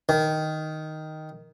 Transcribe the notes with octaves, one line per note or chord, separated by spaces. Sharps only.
D#3